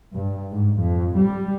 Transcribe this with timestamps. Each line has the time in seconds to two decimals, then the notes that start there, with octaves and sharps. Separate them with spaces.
0.13 G2
0.51 G#2
0.82 F2
1.19 G3